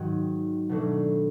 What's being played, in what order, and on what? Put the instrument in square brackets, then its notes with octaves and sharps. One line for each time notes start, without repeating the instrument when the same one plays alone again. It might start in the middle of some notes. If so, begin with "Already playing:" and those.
Already playing: [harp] G#2 D#3 F#3
B2 F#3 A3 D4